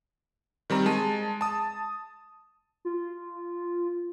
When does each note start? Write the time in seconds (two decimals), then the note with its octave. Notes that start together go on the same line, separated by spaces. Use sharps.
0.70 D#3 G3 C4 A#5
0.86 G#3 A5 D#7
1.41 A5 D#6
2.85 F4